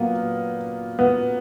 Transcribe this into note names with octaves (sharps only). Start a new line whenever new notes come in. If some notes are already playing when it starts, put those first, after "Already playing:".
Already playing: A#2 F#3 A#3 B3
B3